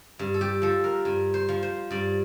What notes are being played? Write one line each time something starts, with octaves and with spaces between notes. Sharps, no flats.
G2
A4
G4
F3 A4
A#4
G2
C5
F3
C5
G2 D5